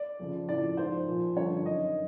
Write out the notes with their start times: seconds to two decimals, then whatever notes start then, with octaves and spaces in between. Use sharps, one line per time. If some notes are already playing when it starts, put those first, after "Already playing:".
Already playing: D5
0.20 F2 C#3 F3
0.49 A2 F3 D5
0.77 G#2 F3 C5
1.07 A#2 F3
1.37 G2 D3 F3 C#5
1.66 F#2 D#3 D#5